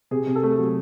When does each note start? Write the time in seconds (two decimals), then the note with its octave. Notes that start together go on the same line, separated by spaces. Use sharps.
0.11 C3 G#4
0.27 C3
0.36 A4
0.43 A3
0.59 F#3